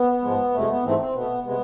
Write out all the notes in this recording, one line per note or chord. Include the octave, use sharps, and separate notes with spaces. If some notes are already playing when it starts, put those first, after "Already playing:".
Already playing: B3
G#2 F3 G#3
F2 C3 G#3 A3
B3
G#2 E3 A3 C4
C4
B2 A3 B3
C3 G#3 B3